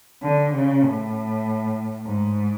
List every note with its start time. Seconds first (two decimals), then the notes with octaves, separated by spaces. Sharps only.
0.23 D3
0.53 C#3
0.83 A2
2.06 G#2